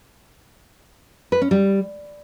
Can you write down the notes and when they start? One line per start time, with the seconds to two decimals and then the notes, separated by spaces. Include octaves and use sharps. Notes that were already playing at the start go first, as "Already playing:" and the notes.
1.32 B4
1.42 C#4
1.51 G3